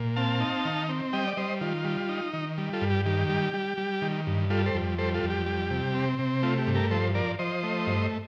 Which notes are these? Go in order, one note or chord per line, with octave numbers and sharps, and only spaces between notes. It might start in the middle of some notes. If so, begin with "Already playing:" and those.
Already playing: A#2
C4 F5 A5
D#4
D#3
C4
G3 D#5 G5
D5
G3 C5 D#5
D#3 F4
G3
D#4
D#3
G3
F4 A4
G2
G4
D#3 G4
G3
G3
G3
D#3
G2
G3 F4 A4
A4 C5
F2
G3 A4 C5
F4 A4
F2
G4
G3
C3
C4
C3
A3 F4
G4
G2
G4 A#4
F3 A4 C5
F3 A#4 D5
F3 C5 D#5
A3
G2